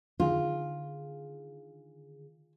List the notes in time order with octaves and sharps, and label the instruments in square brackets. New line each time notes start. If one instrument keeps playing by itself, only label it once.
[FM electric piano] D3 D#3 G#4 [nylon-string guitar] F4